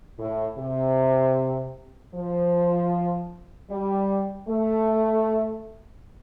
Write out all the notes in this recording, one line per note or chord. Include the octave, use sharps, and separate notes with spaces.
A2
C3
F3
G3
A3